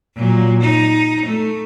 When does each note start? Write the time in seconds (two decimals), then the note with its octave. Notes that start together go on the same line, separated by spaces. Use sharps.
0.16 A#2 F#3
0.61 D#4
1.25 A3